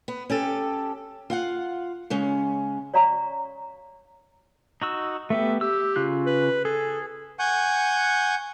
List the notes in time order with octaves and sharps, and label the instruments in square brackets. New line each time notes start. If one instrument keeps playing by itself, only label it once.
[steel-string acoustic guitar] B3
C#4 G4 A4
F4 F5 F#5
C#3 G#3 C#4
[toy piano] C#5 D5 F5 A#5 C#6
[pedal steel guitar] D#4 F#4 E6
[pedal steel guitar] A3 B3 G4 [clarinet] E5
[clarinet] G4 [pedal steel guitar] E6
[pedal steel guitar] C#3 F4 F#6
[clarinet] B4
[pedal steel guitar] G#4 [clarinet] A4
[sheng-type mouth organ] F#5 G#5 C#6 G6